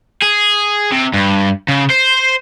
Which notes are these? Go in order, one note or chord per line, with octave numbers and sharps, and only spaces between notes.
G#4
C3
G2
C#3
C5